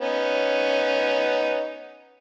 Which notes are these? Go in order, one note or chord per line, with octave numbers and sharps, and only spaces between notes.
B3 C#4 D#4